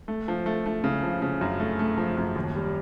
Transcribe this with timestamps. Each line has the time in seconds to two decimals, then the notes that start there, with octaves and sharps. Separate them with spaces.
0.08 A3
0.28 F3
0.46 A3
0.66 A3
0.84 C#3
1.03 F3
1.22 C#3
1.41 F#2
1.60 A3
1.79 A3
1.98 F3
2.17 F#2
2.36 D#2
2.55 G3